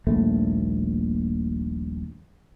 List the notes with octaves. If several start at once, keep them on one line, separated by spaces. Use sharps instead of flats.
D#1 A#1 A3